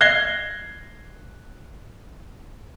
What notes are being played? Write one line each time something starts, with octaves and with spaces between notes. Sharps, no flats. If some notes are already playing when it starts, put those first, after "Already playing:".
F#6 G#6 A#6 C7 G7